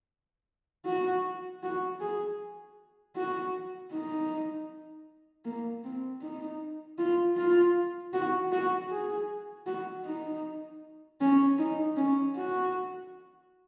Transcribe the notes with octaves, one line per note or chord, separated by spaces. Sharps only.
F#4
F#4
G#4
F#4
D#4
A#3
C4
D#4
F4
F4
F#4
F#4
G#4
F#4
D#4
C#4
D#4
C#4
F#4